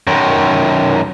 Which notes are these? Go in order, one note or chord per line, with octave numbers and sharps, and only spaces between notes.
F#2 D#3